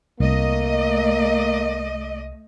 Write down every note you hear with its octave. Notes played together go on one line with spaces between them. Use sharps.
C2 A3 A#3 D#5